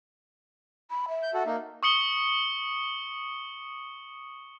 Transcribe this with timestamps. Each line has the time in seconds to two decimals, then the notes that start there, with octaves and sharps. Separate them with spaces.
0.90 B5
1.09 E5
1.23 G6
1.34 F#4 A4
1.46 A#3 D#4
1.83 C#6 D#6 C#7 G7